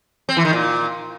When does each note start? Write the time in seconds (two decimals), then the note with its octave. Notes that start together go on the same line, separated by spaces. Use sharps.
0.29 C4
0.37 E3
0.45 D#3
0.53 A#2